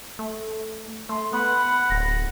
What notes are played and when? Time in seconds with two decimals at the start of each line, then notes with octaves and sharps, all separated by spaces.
0.19 A3
1.09 A3 C6
1.33 B3 F#5 B5
1.90 D1 A#6